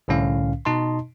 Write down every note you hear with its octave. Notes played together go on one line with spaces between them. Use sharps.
C2 A2 D3 C#4 F5
B2 D#4 D#5 A5 C6